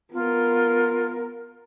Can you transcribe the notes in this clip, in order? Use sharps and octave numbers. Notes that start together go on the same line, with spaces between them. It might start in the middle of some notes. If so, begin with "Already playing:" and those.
B3 F4 A#4